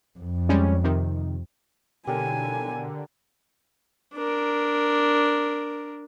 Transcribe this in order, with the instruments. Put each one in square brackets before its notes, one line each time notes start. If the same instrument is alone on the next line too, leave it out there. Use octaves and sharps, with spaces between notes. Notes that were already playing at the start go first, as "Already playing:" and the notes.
[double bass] F2
[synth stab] G3 G#3 C#4
C3 D#3
[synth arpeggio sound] B2 [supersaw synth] D3 [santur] G4 A#4 C#5 [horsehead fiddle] G#5
[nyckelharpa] D4 A#4